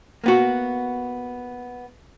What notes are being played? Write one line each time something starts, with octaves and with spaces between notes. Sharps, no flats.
A#3 B3 F#4